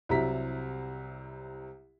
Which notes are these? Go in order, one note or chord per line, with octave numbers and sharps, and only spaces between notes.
C2 C3 F#3 E4 A#5 B6